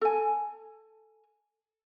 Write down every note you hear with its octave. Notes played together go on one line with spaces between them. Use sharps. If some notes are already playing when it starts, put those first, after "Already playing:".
A4 G#5